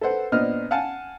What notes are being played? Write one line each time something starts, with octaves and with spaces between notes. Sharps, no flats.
A4 B4 C5 F#5
A#2 B3 D4 C5 D#5 F6
F5 F#5 G#5 A5